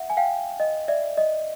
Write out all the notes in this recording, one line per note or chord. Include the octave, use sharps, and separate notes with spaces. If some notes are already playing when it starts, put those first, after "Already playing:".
Already playing: E5 F#5
G#5
F5 G5
D#5
D5 E5
D#5